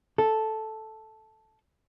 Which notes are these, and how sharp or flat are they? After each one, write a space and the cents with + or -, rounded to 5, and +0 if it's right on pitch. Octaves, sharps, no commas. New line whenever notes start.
A4 -5